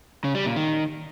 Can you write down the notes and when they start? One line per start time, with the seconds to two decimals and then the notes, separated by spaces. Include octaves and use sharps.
0.24 C#3
0.35 G3
0.46 A#2
0.56 D#3